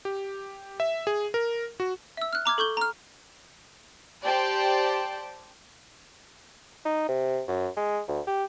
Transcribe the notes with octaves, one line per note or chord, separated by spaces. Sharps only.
G4
E5
G#4
A#4
F#4
E5 E6
F6 F#6
A#5 D6 F6 G#6
A4 C#6 G6 G7
A#5 F6
G4 C5 D5 G5 A5
D#4
C3
F#2
G#3
D2
G4